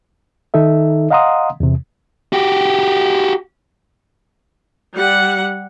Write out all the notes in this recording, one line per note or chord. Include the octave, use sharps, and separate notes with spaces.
D#3 D#4 A4 E5
D#5 F5 F#5 A#5 C6 D#6
E2 C3
F#4 G4
G3 F#5